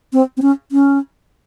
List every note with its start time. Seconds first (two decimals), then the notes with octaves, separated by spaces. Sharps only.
0.13 C4
0.37 C4
0.42 C#4
0.72 C#4